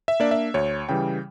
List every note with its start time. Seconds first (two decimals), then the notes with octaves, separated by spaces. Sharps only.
0.08 E5
0.20 A#3 D4 D5
0.31 E5
0.54 D2 C#5
0.89 C#3 E3 G3 G5